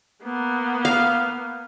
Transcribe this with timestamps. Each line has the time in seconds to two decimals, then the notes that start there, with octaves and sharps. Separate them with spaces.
0.23 A#3 B3
0.85 F5